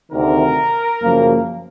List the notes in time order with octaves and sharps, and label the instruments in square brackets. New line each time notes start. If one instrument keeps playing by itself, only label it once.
[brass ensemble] D2 C3 D#3 A#4
F#2 C#3 F3 A#3